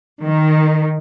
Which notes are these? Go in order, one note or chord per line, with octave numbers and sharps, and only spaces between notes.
D#3